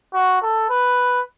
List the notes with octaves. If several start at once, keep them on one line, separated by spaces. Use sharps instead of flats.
F#4
A4
B4